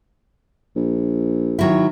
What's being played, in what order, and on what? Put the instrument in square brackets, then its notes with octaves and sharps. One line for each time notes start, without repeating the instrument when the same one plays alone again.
[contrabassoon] A#1
[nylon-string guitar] D#3 F#3 E4